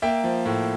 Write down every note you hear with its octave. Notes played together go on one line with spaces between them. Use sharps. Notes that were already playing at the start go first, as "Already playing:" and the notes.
A#3 E5 G5
F3
A2